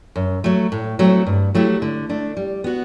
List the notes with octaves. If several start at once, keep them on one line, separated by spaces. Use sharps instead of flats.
F#2
F#3 A3
A2
F#3 A3 C4
G2
F#3 A3 E4 G4
D3
A3 D4
G3
B3 F#4